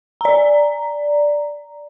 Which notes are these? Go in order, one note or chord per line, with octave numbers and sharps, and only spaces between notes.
D5 A#5